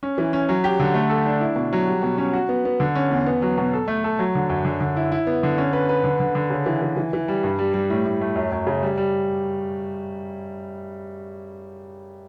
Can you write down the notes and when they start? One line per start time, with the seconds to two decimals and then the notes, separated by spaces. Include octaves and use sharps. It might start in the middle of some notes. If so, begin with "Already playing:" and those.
0.03 C#4
0.18 E3
0.33 C#4
0.49 F#3
0.64 G4
0.80 D3
0.94 A3
1.10 A4
1.26 D4
1.41 E4
1.56 B2
1.73 F#3
1.87 G3
2.03 B2
2.18 C#4
2.33 F#4
2.49 B3
2.65 B3
2.80 D3
2.95 C#4
3.11 E2
3.26 B3
3.42 F#3
3.58 B2
3.73 A4
3.88 A3
4.04 A4
4.19 F#3
4.35 D3
4.49 F#2
4.65 D3
4.80 D3
4.96 E4
5.12 E4
5.27 B3
5.43 D3
5.58 C#4
5.73 B4
5.89 B4
6.04 D3
6.20 D3
6.35 D3
6.50 C#3
6.66 E3
6.82 E3
6.96 E3
7.13 E3
7.28 G3
7.43 G2
7.59 G3
7.74 G3
7.90 A2
8.06 A2
8.21 A3
8.35 F#2
8.52 F#2
8.67 C#3
8.83 G3
8.98 G3